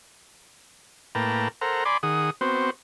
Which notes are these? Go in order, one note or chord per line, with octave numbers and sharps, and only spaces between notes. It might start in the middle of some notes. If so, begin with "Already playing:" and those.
A2 A#3 B4 G5 A5 A#5
A4 A#4 C5 F#5 A#5
D5 G#5 B5 C6 D6
D#3 G#4 F#5 D#6
B3 C4 F#4 C5